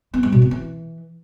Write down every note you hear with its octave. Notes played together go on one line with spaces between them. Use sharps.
B3
G3
B2
B3
E3